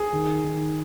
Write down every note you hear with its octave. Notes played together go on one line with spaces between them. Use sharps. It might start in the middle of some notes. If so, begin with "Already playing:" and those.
Already playing: G#4
D#3
D#3